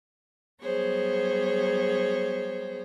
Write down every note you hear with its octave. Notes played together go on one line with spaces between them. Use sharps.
F#3 G3 B3 G#4 C5 C#5